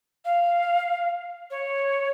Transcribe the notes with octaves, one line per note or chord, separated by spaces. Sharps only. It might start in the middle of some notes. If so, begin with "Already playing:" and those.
F5
C#5